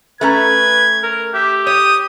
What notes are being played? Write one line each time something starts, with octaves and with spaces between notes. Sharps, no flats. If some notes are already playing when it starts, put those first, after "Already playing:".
A3 C#4 B4 A#5 G#6
A#4
G4 E5
C#5 D#6